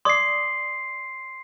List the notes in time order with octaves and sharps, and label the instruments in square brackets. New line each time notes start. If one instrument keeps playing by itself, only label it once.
[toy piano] D5 D6 D#6 [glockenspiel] C6 C7